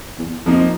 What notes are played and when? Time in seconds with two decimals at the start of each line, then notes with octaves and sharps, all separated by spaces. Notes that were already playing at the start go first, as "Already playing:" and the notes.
0.18 E2
0.46 F2 F3 A#3 D#4